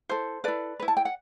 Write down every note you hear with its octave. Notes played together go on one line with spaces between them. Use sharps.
E4 A4 C5
E4 A4 B4 D5
E4 B4
A5
G5
F#5